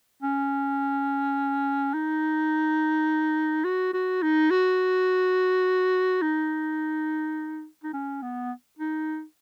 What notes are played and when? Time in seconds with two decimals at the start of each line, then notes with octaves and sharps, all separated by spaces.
0.22 C#4
1.94 D#4
3.65 F#4
3.93 F#4
4.23 D#4
4.51 F#4
6.22 D#4
7.84 D#4
7.93 C#4
8.22 B3
8.79 D#4